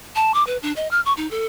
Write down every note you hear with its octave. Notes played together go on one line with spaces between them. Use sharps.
A5
D6
B4
D4
D#5
F6
C#6
D#4
A4